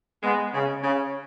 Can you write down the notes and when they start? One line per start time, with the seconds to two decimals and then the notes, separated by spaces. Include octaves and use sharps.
0.23 G#3 B3
0.54 C#3
0.84 C#3